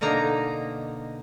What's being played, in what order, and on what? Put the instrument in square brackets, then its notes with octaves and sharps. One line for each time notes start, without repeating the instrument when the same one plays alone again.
[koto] B2 D3 A#3 D#4 A#5